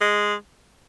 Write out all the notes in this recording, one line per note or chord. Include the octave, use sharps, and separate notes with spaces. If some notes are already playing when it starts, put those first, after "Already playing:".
G#3